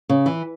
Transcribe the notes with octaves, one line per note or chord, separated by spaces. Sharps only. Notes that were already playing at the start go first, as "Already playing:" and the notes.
C#3
E3